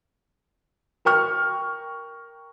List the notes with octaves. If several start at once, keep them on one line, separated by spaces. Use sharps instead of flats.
A#4 G5 C#6 F6